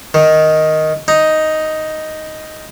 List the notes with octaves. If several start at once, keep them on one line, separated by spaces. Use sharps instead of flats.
D#3
D#4